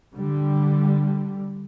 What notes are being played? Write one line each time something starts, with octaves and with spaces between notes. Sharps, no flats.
D3 G3